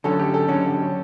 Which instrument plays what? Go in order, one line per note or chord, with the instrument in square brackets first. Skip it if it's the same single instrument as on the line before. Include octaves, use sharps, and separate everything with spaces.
[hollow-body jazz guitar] D3 F#3 C#4 [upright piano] A4
[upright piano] G4
A4
[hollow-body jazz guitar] D3 F#3 C#4